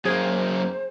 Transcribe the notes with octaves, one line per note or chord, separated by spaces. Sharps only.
F#2 A#3 G#4 C5 C#5 G5